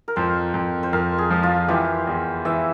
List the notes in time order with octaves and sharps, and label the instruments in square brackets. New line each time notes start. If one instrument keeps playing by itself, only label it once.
[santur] A#4
[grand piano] F2 [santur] C5
[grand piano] F2
[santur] C5
[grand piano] F2 [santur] A#4
[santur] G#4
[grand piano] F3
[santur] F4
[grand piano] E3 [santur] G4
[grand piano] E2
[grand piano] E3 [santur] E5